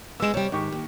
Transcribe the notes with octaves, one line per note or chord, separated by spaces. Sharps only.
G#3 B3 E6 E7
C3 G3 C#5
G#2 D#3 G4 C#6
D#2